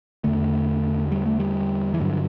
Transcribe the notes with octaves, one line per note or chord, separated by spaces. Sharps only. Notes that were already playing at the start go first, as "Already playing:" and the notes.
E2 D3 A3
G3
A3
G3
E3
G2 D3 F#3